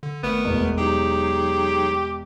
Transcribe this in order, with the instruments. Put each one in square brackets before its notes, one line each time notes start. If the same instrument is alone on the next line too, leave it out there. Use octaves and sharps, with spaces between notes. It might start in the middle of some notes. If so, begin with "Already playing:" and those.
[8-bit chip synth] D3
[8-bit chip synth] G#1 A3 A#4 [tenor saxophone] B3
[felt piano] E1
[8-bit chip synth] F#3 D#4 G#4 [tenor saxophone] G4